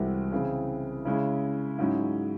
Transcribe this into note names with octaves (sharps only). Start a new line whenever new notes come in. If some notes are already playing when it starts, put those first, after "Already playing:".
Already playing: C2 C3 E3 G#3 C4 F#4
C#3 E3 C4 G#4
C#3 G#3 C#4 E4
G#2 F#3 C#4 E4